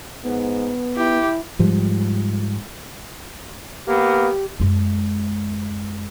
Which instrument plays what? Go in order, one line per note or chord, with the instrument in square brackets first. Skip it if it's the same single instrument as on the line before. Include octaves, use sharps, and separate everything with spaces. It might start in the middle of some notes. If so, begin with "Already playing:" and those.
[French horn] G#2 [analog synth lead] B3
[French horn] E4 [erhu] G4
[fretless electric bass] G#2 F3 G3
[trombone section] A#3 B3 [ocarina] G4
[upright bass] F#2 G#3